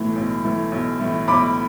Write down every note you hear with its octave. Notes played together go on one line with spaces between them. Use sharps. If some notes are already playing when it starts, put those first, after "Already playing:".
Already playing: B1 A2 E3 A3
B1
A2 E3 A3
B1
A2 E3 A3
B1 B5 D6